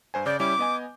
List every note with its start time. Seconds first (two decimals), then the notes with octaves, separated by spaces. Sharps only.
0.14 G2 C5 G#5
0.26 C#3 D5 D6 G6
0.40 G3 C#4 E4 D6
0.59 B3 D#5 G#5